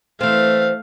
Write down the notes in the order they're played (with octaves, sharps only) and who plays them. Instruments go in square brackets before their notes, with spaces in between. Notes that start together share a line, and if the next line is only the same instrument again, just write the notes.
[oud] E3 C4 [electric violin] A3 F5